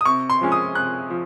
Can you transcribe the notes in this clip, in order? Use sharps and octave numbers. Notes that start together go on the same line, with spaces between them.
D#6
C3 C#6
C6
F3 G#3 C#4
D#6
C3 F#6
F3